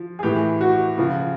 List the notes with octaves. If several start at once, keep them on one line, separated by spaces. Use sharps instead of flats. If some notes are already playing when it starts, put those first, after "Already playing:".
Already playing: F3
G#4
A2 E3 G4
F#4
C#3 F3